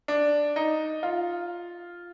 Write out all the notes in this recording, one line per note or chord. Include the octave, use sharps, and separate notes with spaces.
D4
D#4
F4